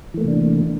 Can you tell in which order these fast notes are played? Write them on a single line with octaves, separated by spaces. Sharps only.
E3 A3 A#3 C3 D4